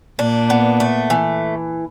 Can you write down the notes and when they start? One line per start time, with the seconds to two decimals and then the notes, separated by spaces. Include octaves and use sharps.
0.19 A#2 D4
0.50 B3
0.80 A3
1.10 E3